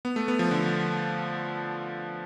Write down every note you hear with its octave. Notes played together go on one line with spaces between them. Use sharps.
B3
A3
B3
F3
D3